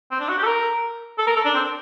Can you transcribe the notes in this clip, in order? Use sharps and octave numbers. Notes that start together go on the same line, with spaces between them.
C4
D4
F#4
G4
A4
A#4
A4
A#4
A4
D4
C4